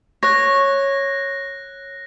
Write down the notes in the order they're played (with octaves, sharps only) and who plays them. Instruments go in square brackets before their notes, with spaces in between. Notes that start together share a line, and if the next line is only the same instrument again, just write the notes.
[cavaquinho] C#5 [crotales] F#6 A#6